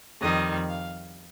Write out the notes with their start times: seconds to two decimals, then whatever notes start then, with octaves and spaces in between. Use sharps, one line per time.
0.21 F2 D#3 G3 D#5
0.69 F5